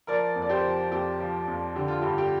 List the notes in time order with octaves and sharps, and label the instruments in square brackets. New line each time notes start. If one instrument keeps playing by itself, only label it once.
[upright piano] F3 A#4 D5
F2
D5
G4 C5
F3
F2 G4
F3
F2
D3 G4
F4
G2 G4
G4